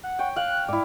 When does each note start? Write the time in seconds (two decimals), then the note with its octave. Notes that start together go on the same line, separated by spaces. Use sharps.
0.03 F#5
0.19 C#5 G5
0.36 F5 G5 F#6
0.68 G#2 E4 D5